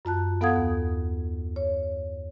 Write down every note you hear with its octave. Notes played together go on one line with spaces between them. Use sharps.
F#2 F4 A5 F#6
B3 A4 F5 F#5 D#6 G#6
D#2
C#5